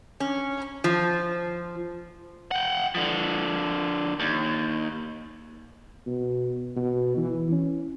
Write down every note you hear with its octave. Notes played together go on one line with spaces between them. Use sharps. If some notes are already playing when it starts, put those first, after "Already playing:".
C#4
F3
F#5 G5
D3 F3
D#2
B2
B2
E3
C#4